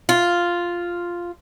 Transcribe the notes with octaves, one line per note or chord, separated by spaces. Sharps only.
F4